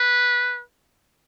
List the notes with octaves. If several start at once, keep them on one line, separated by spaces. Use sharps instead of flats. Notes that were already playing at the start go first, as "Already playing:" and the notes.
Already playing: B4